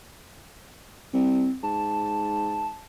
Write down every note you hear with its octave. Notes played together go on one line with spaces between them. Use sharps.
C2 C4
G#2 A5